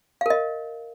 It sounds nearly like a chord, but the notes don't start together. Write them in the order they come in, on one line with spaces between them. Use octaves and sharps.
F5 A#4 D#5